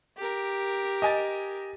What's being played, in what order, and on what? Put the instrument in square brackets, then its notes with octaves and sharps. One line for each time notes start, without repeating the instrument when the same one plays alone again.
[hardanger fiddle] G4 A#4
[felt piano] D#5 G#5 A6